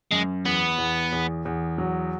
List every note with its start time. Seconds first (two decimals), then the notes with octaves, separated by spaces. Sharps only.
0.11 F#2 G#3
0.45 E2 B3
0.78 E2
1.12 E2
1.45 E2
1.78 F#3